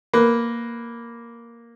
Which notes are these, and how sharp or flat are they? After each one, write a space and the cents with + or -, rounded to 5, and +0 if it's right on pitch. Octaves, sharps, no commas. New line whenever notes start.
A#3 +0 B4 +0